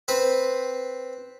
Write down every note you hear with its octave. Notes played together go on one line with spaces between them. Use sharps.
C4 B4